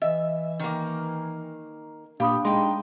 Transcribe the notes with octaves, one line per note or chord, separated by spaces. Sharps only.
E3 D#5 E5
D#3 A#3
A#2 D4 G4 F5 B5 D#6
G#3 D#4 G5 C6